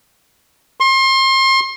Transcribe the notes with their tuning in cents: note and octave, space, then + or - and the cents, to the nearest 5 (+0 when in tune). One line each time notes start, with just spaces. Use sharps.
C6 +35